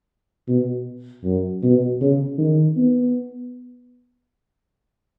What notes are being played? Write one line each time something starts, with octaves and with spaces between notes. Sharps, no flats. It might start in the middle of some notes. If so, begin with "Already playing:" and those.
B2
F#2
B2
C#3
D#3
B3